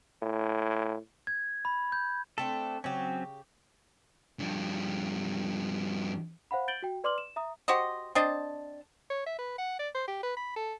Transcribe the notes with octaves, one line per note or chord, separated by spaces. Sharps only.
A2
G#6
B5
G6
A3 C4 D4 A4
C#3 F#3 C4 C#4 G4
G2 F3
C5 F5 F#5 B5
G6 A6 D7 F#7 G7
F#4 G5
B4 D5 C6 D6 F6 F#7
E7
E5 A#5 D#6
F#4 G4 C5 D#5
C4 D4 D#5 A5
C#5
E5
B4
F#5
D5
C5
G4
B4
B5
A4